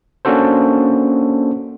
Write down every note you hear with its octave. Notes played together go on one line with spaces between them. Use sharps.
A#3 C#4 D4 F#4 A4 C5